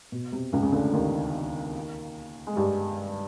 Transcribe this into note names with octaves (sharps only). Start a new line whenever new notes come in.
B2
C3
C#2 C#3
C#3
D2 D3
D#2 D#3
G#3
G2 G3